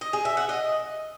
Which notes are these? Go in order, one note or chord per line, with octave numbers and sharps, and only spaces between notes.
D#5
G#4
E5
F#5
D#5